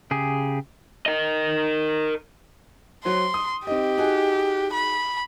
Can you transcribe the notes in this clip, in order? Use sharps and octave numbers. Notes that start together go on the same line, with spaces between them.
C#3 G4 G#4
A#4 D#5
F#3 F#4 C5 C6
D#6
C4 D#4 G4 D#5
D#4 F#4 G#4
B5